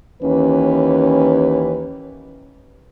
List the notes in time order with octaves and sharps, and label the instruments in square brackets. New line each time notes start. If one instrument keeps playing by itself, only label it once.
[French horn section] D#2 E3 C#4 B4